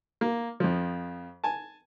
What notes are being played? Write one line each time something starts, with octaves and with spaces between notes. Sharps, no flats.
A#3
F2 F3
G#5 A5